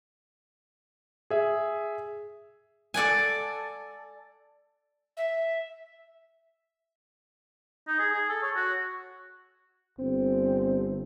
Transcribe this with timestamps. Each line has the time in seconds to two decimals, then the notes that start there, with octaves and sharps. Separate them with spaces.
1.30 G#4 E5
2.94 A4 D5 F#5 G#5
5.17 E5
7.88 D#4
7.99 G#4
8.13 G#4
8.30 A4
8.43 C#5
8.56 F#4
9.99 G1 C4